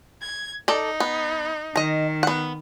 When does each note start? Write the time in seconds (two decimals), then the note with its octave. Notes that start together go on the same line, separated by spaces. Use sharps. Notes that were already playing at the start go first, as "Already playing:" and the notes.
0.22 G#6
0.68 D#4 A4 D5
1.00 B3
1.76 D#3 D#5 A#5
2.23 B3 F#5